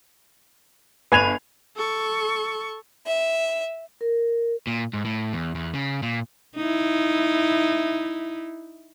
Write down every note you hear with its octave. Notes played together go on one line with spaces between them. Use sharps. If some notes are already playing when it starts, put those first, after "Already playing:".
G1 B4 G#5 G#6 F7
A4 C#6
E5
A#4
A#2
G#2
A2
E2
E2
C#3
A#2
D#4 E4